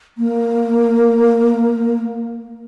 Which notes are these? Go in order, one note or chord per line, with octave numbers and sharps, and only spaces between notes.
A#3